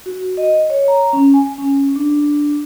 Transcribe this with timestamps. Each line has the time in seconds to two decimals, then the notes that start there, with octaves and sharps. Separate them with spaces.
0.06 F#4
0.37 D#5
0.70 C#5
0.88 A#5
1.13 C#4
1.34 G#5
1.58 C#4
1.96 D4